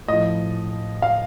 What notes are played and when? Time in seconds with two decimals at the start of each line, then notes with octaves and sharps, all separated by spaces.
0.08 A2 F3 D#5
1.02 F5